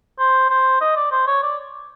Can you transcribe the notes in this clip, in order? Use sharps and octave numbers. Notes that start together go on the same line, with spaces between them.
C5
C5
D#5
D5
C5
C#5
D5